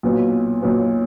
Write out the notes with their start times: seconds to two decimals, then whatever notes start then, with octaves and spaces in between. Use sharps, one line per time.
0.03 B1 A#2 F#3 B3
0.62 B1 A#2 F#3 B3